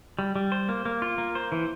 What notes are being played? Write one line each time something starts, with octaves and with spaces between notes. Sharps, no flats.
G3
G3
C5
A#3
A#3
F4
A#3
C5
E3